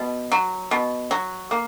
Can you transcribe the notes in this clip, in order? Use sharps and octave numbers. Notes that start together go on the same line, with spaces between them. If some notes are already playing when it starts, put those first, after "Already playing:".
Already playing: B2
F#3
B2
F#3
A#3